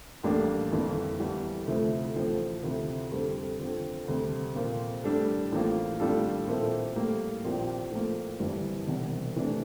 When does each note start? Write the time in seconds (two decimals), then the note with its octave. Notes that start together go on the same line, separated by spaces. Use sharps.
0.23 A1 A2 G3 A#3 D4
0.71 G1 F2 E3 A#3
1.20 E2 E3 G3
1.67 D2 C3 F3 A3 E4
2.15 A1 A2 F3 A3
2.63 D2 C3 F3 C4 E4
3.11 F2 D3 G3 C4
3.60 D3 F3 C4
4.08 D2 C3 G3
4.55 A#2 F3 C4 F4
5.04 A2 G3 D4 A4
5.52 A1 A2 F3 A#3 F4
6.00 A2 G3 D4 F4 A4
6.47 A#2 F3 C4 E4 A4
6.96 A2 G3 A#3
7.44 A#1 A#2 F3 C4 G4
7.92 A2 F3 A#3
8.40 G1 G2 E3 G3 C4
8.87 E1 E2 C3 G3
9.36 C3 E3 A3 D4